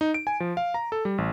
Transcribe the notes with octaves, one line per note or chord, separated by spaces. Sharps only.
D#4
D7
G#5
F3
F5
A#5
A4
G3
A1